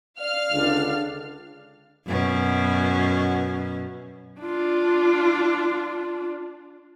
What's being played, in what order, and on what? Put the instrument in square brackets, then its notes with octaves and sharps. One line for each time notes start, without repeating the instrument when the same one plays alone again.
[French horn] D5 [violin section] F5 F6
[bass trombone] C#2 [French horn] D3 [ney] D4
[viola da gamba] F#2 B2 C#4
[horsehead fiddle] D4 F4